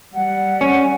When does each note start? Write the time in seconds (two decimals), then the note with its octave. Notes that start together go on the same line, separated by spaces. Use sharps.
0.14 G3 F#5
0.61 C#4